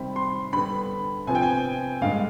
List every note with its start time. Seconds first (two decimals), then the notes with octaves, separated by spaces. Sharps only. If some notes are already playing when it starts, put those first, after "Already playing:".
Already playing: C3 D#3 G3 C4 B5
0.16 C6
0.53 D3 G3 B3 B5
1.27 C3 F3 B3 G#5
1.35 G5
1.42 G#5
2.02 G2 D3 G#3 F5